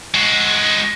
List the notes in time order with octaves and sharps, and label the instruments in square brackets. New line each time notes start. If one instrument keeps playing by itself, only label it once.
[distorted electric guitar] G#3 F#4